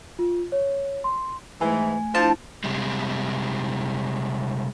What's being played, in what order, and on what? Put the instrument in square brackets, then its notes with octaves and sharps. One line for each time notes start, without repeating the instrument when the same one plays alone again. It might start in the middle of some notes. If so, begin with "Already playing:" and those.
[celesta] F4
C#5
C6
[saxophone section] G#2 E3 [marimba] A3 [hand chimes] G#5
[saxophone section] F3 [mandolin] C4 A5 [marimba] D4 E4
[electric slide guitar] C3 G3 G#3